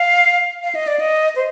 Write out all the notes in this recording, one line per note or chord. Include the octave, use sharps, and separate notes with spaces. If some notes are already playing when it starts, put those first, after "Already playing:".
Already playing: F5
F5
D#5
D5
D#5
C5